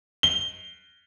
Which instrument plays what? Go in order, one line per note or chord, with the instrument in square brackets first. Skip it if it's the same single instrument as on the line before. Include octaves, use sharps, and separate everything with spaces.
[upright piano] G7